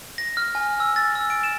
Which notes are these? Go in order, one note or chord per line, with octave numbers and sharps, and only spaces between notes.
A#6
F6
G#5
E6
A6
E6
D7
E7